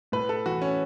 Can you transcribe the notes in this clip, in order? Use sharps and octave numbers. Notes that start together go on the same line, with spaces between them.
A2 B4
A4
E3 F#4
C#4